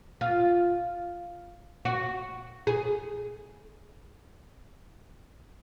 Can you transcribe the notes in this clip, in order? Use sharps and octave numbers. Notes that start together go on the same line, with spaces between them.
F4
F#4
G#4